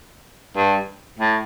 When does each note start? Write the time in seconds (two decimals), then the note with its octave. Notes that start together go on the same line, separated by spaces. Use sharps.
0.56 G2
1.19 A2